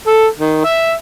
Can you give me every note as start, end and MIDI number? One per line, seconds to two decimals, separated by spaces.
0.07 0.26 69
0.38 0.62 51
0.65 0.93 76